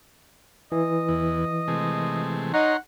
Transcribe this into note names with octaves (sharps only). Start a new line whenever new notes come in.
E3 D#5
E2
C3 G#3 A3
D#4 C#5 F#5 A#5 C6